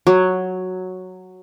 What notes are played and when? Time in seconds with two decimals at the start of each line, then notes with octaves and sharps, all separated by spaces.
0.07 F#3